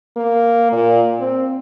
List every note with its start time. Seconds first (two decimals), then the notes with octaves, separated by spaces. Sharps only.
0.17 A#3
0.72 A#2
1.19 C4